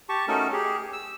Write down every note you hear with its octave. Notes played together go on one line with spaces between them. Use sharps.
G4 A5 C#6
A3 C#4 D#4 F#4 A4 A#4
G4 G#4
E6